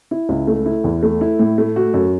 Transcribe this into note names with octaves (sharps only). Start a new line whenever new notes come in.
E4
C#2
A3
E4
E2
A3
E4
A2
A3
F#4
F#2